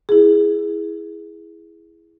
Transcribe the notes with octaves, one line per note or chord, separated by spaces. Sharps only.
E4 G#4